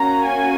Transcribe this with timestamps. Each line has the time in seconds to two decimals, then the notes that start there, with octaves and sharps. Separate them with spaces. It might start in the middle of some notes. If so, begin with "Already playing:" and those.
Already playing: A#3 C#4 F#4 A#5
0.23 G#5